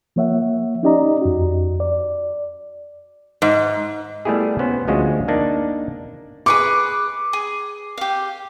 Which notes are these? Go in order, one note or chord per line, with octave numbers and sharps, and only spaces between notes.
F3 A#3 C#5 E5 F#5
C#4 D#4 G4 D5 D#5 A#5
F2 F#4
D5
G#2
G3 A3 B3 E4 G4 G#4
B3 C#4 C5
D2 F3 G#3 C#4 F4 F#4
A#3 D4 D#4
G#4 B4 C#6 D6
G#4
G4 F5